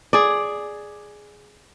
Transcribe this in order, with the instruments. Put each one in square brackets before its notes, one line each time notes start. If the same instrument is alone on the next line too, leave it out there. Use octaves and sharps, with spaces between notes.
[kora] G#4 D5